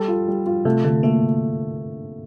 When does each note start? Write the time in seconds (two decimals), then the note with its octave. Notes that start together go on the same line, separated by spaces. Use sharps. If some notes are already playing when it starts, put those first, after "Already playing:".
Already playing: G3 A4
0.08 F4
0.28 G3
0.46 F4
0.65 C3 A3
0.84 D3 A3
1.03 A3 A#3